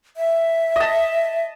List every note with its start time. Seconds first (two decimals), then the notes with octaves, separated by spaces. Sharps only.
0.17 E5
0.76 D#5 A5